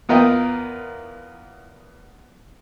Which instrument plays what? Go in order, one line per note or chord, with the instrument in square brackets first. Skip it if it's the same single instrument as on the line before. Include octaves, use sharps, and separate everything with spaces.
[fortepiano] E2 B3 F4 A#4 D#5 G5